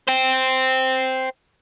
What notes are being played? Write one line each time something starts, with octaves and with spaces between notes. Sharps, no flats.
C5 G5